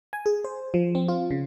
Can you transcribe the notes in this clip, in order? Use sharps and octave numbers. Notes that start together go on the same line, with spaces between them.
G#5
G#4
C5
F3
C4
F4
C#3